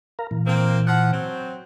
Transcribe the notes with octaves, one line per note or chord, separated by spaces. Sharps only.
A#4 F5 A#5
A#2 E3
A#3 C4
F3 F#5
F#3 C4